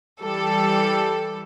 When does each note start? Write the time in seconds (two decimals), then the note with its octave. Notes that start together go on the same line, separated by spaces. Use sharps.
0.20 E3 G3 A4